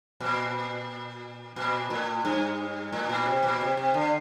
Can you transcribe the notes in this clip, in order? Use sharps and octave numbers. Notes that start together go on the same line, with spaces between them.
A#2
A#2
A2
G2
A2
A#2
C3
A#2
C3
C3
D3